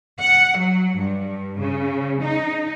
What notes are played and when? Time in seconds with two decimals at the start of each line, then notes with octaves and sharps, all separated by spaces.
0.20 F#5
0.58 F#3
0.98 G2
1.60 C#3
2.23 D#4